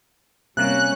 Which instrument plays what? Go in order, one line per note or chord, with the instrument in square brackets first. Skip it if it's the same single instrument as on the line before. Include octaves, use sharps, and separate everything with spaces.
[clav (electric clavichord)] C3 A#3 [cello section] G3 C#4 [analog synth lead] F#6